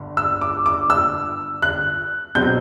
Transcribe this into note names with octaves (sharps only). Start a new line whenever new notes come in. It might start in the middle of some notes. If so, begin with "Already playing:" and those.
Already playing: G1 G2 D3
E6
D6
D6
E6
F#6
B2 F#3 C4 G6